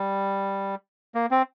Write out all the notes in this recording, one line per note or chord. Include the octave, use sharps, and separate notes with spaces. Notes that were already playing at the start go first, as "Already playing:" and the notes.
Already playing: G3
A#3
C4